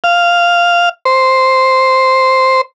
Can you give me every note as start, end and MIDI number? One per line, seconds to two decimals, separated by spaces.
0.04 0.89 77
1.05 2.61 72